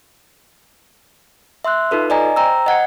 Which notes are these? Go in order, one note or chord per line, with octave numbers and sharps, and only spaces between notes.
E5 C6 E6 F#6
D#4 F4 A4 B4
D5 D#5 G#5 A#5
C5 G5 A#5 E6
D#5 F#5 G#6 C#7